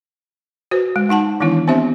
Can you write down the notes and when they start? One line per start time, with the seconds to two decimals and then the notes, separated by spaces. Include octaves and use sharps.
0.71 F#4 B4 C5
0.96 G#3
1.09 G#3 D#4 F#5 A5
1.40 D#3 E3 G#3 B3 D4 E4
1.68 B3 C4 D4 G4 C5 E5